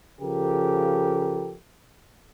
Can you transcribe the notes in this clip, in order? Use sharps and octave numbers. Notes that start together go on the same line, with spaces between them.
C#3 F3 G4 A4 A#4